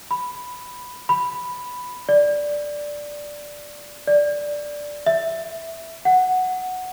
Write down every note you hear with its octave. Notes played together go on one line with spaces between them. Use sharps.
B5
B5
D5
D5
E5
F#5